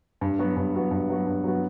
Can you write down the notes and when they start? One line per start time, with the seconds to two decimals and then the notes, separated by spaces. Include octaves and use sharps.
0.21 G2
0.39 F#3 B3 F#4
0.57 G2
0.74 F#3 B3 F#4
0.91 G2
1.09 F#3 B3 F#4
1.27 G2
1.44 F#3 B3 F#4